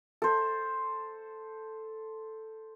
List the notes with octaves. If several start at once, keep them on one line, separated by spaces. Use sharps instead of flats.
A4 C5